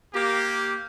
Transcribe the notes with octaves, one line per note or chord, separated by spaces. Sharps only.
A#3 G4